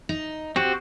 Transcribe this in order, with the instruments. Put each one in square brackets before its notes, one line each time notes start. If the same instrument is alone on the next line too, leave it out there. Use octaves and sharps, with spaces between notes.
[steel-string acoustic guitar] D#4
[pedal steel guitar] C4 F#4 [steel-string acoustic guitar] G4